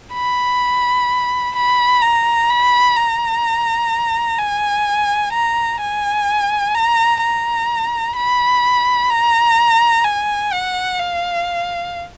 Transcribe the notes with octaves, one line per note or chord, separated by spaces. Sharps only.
B5
B5
A#5
B5
A#5
G#5
A#5
G#5
A#5
A#5
B5
A#5
G#5
F#5
F5